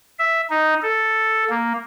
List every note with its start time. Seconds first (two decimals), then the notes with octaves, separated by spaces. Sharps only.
0.19 E5
0.50 D#4
0.82 A4
1.49 A#3